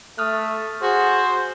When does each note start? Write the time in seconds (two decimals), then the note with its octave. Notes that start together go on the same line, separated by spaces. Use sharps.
0.18 A3 D#6 F6 F#6
0.82 F#4 G#4 C5